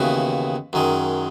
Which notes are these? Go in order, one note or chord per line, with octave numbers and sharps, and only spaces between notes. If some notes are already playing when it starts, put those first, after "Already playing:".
Already playing: D#2 C#3 E3 B3 F#4
F#2 D#3 G#3